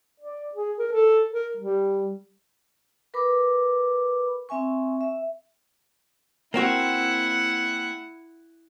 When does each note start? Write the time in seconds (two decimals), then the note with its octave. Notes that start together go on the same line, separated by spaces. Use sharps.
0.20 D5
0.55 G#4
0.79 A#4
0.92 A4
1.33 A#4
1.57 G3
3.14 A#4 B4 B5 D6
4.49 C4 E5 G#5 C#6
5.01 E5
6.54 A#3 C4 E4 F#4 F#5